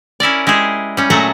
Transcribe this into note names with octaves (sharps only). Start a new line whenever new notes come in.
C#4 E4 A#4 D5
G#3 E4 G4 G#4
G3 C#4
A#2 F#3 G#3 A3 F#5 A#5